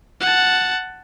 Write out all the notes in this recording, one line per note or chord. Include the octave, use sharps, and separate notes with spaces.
F#5 A5